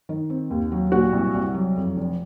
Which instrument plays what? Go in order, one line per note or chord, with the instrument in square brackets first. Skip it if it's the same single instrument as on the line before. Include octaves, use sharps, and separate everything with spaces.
[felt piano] D#3
C4
D#2
F#3
A#2 F#4
C2
C2
F#3
F2
F1